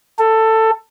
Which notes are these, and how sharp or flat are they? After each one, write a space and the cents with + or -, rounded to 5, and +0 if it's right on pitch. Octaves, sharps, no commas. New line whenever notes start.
A4 +15